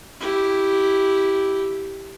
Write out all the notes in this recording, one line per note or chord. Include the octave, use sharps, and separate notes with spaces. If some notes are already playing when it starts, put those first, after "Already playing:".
E4 G4